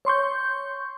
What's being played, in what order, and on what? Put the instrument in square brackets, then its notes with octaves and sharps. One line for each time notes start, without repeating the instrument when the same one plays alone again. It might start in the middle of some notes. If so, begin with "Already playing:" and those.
[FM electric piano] C#5 C6 C#6 G6